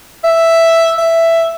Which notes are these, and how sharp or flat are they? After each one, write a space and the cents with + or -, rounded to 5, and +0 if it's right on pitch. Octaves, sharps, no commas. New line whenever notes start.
E5 +0
E5 +5